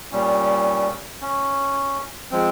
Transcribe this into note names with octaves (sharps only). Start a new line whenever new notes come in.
A#2 G3 C#4
C#4
F3 G#3 C4